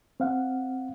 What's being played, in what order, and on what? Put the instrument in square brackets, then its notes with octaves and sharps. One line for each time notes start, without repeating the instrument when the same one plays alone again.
[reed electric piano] C4 F5 F#5